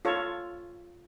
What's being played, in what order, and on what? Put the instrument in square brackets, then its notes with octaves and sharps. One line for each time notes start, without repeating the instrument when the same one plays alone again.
[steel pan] F4 A4 C#5